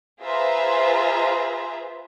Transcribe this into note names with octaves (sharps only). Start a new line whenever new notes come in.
F4 G#4 B4 C5 E5 A#5